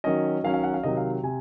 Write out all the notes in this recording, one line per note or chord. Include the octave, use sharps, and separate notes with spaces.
D#3 F#3 C#4 D#5
D#3 F#3 C#4 F5
F5
F#5
F5
C3 D#3 F#3 D#5
F5
C3 G#5